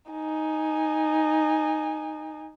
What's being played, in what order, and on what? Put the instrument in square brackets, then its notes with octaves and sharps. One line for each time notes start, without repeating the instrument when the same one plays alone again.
[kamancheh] D#4 G#5